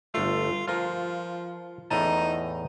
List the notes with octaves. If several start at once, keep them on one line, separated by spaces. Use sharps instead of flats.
G1 A3 F4
F3 F4 A#4
E2 A2 D#4 A5